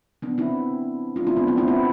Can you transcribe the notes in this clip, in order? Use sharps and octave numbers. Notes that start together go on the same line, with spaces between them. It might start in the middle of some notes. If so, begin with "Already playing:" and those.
B3 D4
C4 E4
D4 F4
C4 E4
B3 D4
B3 D4
C4 E4
C4 E4